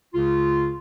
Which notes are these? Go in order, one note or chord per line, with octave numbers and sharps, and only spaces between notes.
C#2 C#3 F4